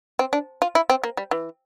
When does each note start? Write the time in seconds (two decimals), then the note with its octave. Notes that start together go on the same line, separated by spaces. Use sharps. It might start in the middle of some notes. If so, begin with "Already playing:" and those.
0.19 C4
0.33 D4
0.62 F4
0.75 E4
0.90 C4
1.04 A#3
1.17 G3
1.31 E3